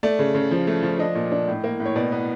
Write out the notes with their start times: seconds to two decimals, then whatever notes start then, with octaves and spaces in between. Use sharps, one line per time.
0.03 A3 D5
0.19 C#3
0.34 C#3
0.51 F3
0.67 A3
0.83 F3
0.99 D4 D#5
1.15 A#2
1.32 D4
1.48 A2
1.64 A#3
1.80 A2
1.85 C#5
1.96 B2 D5
2.12 B3